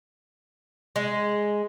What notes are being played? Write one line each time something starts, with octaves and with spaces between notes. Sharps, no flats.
G#3